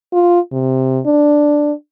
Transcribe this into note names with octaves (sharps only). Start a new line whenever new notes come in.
F4
C3
D4